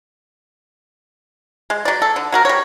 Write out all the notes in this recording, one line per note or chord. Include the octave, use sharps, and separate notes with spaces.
G#3
F#3 D5
A4
D3
F#3 F#4 A#4
G3 C#5